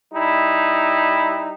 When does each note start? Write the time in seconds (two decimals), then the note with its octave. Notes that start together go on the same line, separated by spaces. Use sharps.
0.14 G3 D#4 E4